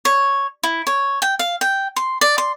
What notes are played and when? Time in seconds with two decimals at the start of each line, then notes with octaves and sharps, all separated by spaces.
0.05 C#5
0.63 E4
0.87 C#5
1.22 G5
1.39 F5
1.61 G5
1.96 C6
2.21 D5
2.38 C6